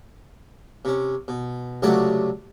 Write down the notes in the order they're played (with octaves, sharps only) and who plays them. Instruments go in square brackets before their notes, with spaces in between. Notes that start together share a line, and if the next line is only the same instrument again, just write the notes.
[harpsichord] C3 C#4
B2
C#2 C3 F#3 A3 F#4 D5